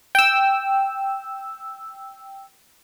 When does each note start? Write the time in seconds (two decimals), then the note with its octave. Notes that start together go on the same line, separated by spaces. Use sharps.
0.15 G5 E6